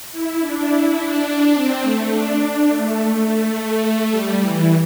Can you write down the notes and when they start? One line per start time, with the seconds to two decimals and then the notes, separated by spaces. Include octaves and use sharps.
0.11 E4
0.41 D4
0.69 E4
0.97 D4
1.54 C4
1.83 A3
2.11 D4
2.68 A3
3.54 A3
4.10 G3
4.39 E3